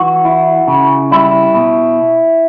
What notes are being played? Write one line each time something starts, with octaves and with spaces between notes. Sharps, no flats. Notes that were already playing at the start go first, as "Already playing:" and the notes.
Already playing: E3 F#4
E4
C#3
G3 E4
B2